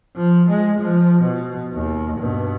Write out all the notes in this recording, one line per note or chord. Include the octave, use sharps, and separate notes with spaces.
F3
G#3
F3
B2
D#2
G2 B2